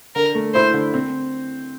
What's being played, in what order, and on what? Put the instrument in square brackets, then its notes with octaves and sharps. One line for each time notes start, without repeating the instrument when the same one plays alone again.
[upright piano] D3 [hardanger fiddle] A#4
[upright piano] A3
[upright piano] E4 [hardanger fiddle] C5
[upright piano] D3
C4